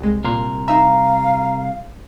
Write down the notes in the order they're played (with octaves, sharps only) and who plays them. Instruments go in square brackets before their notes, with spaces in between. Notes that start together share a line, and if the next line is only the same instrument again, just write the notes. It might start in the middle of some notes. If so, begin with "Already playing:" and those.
[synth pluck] C2 G#3
[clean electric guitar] C2 A#4 C6 [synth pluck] A#2
[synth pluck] D#4 E5 [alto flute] F5 [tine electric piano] A#5